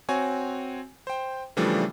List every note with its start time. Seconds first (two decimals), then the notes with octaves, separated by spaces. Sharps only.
0.09 C4 F#4 C#5 G#5
1.07 C5 G5
1.57 C#3 E3 F3 G3 A3 D4